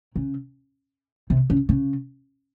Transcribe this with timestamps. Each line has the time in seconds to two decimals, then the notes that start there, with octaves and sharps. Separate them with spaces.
0.16 C#3
1.30 C3
1.50 C#3
1.69 C#3